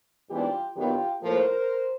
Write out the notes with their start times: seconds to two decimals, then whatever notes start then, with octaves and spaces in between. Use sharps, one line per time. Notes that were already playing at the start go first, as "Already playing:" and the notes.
0.29 G#2 E3 G3 B3 D4 F4 G4
0.76 G2 D#3 F#3 B3 F4 G4
1.22 A2 F3 A#3 A#4 C5